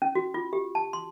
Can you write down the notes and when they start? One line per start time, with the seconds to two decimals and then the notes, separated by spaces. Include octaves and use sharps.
0.02 C#4
0.15 F#4
0.34 F4
0.53 G4
0.75 A5
0.93 C6